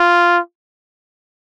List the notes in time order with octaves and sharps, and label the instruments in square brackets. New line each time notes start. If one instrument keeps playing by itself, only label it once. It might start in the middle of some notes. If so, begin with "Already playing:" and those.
Already playing: [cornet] F4